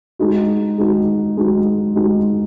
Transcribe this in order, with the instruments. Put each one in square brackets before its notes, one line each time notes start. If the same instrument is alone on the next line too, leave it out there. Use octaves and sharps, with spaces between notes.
[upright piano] G#3 D#4 F#4
G#3 D#4 F#4
G#3 D#4 F#4
G#3 D#4 F#4